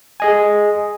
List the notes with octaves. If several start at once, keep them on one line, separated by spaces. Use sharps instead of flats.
G#4 D#5 G#5